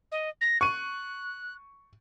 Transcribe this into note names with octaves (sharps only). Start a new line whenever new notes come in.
D#5
A#6
C#6 F#6 D#7